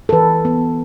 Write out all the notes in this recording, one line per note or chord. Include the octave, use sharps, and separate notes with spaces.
A4
E3 B4
B3